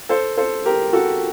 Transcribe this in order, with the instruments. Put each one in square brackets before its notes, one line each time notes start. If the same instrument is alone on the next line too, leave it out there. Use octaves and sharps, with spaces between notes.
[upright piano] A4 C5
A4 C5
G4 A#4
F#4 A4